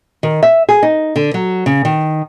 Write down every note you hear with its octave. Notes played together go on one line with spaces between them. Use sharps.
D#3
E5
G#4
D#4
D3
F#3
C#3
D#3